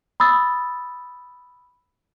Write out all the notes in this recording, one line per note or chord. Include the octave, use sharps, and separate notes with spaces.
B5 D#6 E6 A6